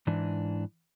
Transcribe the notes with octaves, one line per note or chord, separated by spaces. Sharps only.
G#2 E3 D4